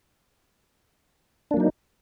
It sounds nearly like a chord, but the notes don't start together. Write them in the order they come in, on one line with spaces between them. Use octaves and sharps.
D4 A#3 F#3 D#4